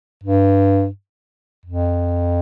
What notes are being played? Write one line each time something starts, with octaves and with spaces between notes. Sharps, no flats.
G2
F2